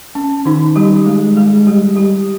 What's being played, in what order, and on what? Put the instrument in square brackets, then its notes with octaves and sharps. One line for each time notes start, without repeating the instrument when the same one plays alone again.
[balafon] C#4
D#3 D#4
G3 G4
G#3 G#4
G#3 G#4
G3 G4
G3 G4